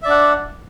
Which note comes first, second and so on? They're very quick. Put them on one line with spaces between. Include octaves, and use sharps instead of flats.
E5 D5 D4 F#5